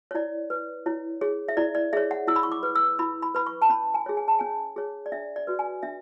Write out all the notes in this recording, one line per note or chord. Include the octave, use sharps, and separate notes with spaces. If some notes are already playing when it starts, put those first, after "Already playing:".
C#5
E4 D5
B4
E4 C#5
G#4 C#5
E5
E4 D5
D5
G#4 C#5 E5
F#5
E4 E6
B5
C#6
D6
B4
E6
E4 B5
B5
B4 B5
C#6
A5
C#4 B5
G#5
G#4 C#5
G#5
A5
C#4 G#5
G#4 C#5
D5
D4 E5
D5
F#4 B4
G#5
D4 E5